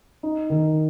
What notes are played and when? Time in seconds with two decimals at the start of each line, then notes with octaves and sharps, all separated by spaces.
0.23 D#4
0.50 D#3